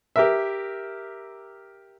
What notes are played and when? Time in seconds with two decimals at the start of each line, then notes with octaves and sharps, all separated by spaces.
0.16 G4 A#4 E5